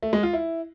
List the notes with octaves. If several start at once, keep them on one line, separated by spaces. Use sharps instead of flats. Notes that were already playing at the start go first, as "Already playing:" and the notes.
A3
G#3
F4
E4